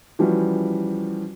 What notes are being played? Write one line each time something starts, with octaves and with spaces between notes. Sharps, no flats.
E3 F3 G3 C#4 F#4